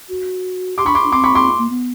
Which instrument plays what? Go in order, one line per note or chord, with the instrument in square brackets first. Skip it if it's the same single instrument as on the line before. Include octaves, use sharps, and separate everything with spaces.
[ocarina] F#4
[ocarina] G4 [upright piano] C6 D6
[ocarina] D4 [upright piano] B5 C#6
[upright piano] C6 D6
[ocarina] D4
[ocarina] C4 [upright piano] C6 D6
[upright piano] B5 C#6
C6 D6
[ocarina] A#3
B3